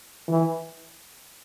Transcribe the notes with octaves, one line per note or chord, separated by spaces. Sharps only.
E3